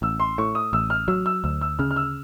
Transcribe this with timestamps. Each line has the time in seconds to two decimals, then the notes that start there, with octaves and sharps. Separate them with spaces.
0.02 A1 E6
0.20 C6
0.38 A2 C#6
0.55 D#6
0.73 A1 E6
0.90 F6
1.08 F#3 E6
1.26 E6
1.44 D2 E6
1.61 E6
1.79 C#3 F6
1.91 F6
1.96 E6